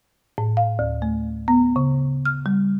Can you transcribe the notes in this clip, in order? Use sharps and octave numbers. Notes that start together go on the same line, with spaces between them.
A2
F5
D2
A3
B3
C#3
F6
G3